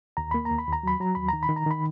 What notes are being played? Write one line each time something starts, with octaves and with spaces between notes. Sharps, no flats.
D#2 A#5
A#3 B5
A#5
D#2
B5
D#2
A#5
F#3 B5
F#3 A#5
D#2 B5
D#3 A#5
B5
D#3
A#5
D#3 B5